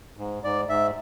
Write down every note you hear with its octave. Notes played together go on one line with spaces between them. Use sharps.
G#2
G#2 D5
G#2 E5